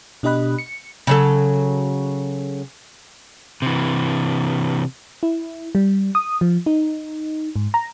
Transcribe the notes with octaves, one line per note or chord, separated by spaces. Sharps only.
B2 D4 G4 D#5 B5 F#6
C#7
C#3 F#3 A4
C3 E3
E4
G3
D#6
F3
D#4
G#2
A#5